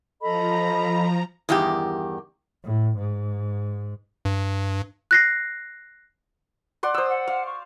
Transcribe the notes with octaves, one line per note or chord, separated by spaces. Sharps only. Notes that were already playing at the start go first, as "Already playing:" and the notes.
F3 A4 D#5 A#5 B5
E2 G2 D#3 G4
A2
G#2
G2
F#6 A#6 C7
D5 F#5 C6
C5 D#6 E6
F#5
F5
C#6